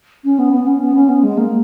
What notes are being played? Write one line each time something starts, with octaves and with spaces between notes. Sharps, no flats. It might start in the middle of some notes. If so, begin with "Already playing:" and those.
C#4
B3
B3
C#4
B3
C#4
B3
G#3
A#3